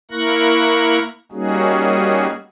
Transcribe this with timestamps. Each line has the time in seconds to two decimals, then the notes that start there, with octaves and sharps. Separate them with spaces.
0.11 A#3 E4 A#4 C#6 F#6 A#6
1.32 G3 A#3 C#4 D#4 F#4 G#4